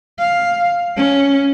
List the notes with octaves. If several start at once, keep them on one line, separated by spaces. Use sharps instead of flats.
F5
C#4